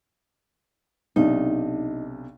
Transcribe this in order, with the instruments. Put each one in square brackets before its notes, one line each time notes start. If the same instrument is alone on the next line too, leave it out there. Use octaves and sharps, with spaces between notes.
[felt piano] B1 C3 D4 [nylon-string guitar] D#4